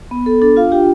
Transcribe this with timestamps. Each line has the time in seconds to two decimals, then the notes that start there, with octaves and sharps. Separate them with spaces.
0.11 B3
0.26 A4
0.41 D4 A4
0.57 F4 F5
0.72 F4 G4 G5